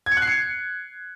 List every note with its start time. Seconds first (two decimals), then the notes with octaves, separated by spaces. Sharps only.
0.06 G#6
0.12 C#7
0.17 F#6
0.22 C7
0.27 C#7